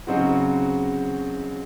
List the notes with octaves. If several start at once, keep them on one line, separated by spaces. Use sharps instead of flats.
C#3 F#3 C4 D#4 F#4